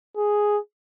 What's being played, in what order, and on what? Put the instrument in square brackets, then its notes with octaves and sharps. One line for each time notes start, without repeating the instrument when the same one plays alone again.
[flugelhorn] G#4